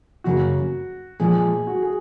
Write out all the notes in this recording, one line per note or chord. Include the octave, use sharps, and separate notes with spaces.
F#2 C#3 F#3 A#3 F#4
A#2 F3 G#3 G#4
F#4
G#4